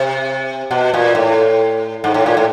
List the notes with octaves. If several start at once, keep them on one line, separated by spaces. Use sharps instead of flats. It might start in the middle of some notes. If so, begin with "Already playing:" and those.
Already playing: C3
B2
A#2
A2
G#2
A2
A#2
A2